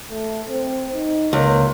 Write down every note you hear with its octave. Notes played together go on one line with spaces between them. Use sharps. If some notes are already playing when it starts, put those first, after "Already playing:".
A3
C4
D#4
C#2 A#3